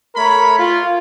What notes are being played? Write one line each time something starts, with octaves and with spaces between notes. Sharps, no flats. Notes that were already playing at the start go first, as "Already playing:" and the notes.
A3 A#4 C#5 B5
F4